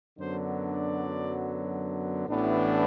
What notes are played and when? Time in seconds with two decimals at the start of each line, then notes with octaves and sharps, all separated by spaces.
0.19 F#2 D3 F#3 B3 D4 C5
0.71 D5
2.28 A1 A2 E3 B3 D4